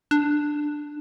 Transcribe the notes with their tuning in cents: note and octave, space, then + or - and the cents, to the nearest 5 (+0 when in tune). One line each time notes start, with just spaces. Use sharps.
D4 +10